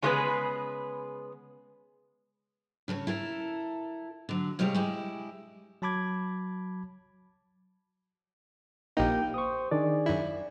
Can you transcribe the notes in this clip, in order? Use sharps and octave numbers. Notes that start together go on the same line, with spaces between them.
C#3 G#3 A3 B3 G#4 B4
C#3 A4 A#4 C#5
E4 A4 A#4
D3 F#3
C3 G3 G#3 C#5 F5
G#3 E4 G4
F#3 A5 B5 D6 G#6
A#1 A#3 D#4 G4 G5
C5 C#6 D#6
D#3 D4 G#4 D5
F#2 E4